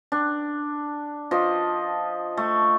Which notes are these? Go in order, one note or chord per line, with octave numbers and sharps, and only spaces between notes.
D4
F3 D#5
A3